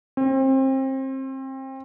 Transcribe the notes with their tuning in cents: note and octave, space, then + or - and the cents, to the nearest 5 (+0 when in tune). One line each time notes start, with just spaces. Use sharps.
C4 +30